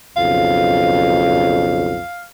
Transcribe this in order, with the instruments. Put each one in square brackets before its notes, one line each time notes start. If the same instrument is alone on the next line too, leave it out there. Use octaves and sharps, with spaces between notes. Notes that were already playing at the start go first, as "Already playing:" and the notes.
[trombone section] B1 F2 C#3 [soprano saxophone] F5